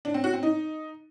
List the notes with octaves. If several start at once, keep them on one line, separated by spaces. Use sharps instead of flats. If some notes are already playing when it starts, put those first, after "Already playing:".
D4
C4
F#4
C4
D#4